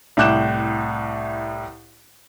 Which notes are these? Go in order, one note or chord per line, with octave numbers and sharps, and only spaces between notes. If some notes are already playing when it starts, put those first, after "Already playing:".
C2 A2 D6 F#6 G6 E7